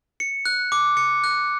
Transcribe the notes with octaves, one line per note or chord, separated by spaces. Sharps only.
C#7
F#6
D6
C#7
F#6